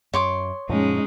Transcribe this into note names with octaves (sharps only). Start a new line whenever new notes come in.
F#2 C#5 C6 D6
F#2 A#2 F3 G#3 C#4 D#4